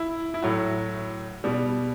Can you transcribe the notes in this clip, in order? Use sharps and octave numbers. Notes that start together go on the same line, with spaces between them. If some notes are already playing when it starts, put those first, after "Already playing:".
Already playing: E4
E4
A2 F#3 F#4
B2 G3